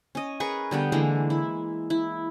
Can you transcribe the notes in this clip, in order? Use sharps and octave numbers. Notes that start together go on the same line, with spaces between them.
C#4 D#5
G#4 A#4 B4 C#6
D3 G3 B3 G5
D3 E3 G#3 A#3
E4
E4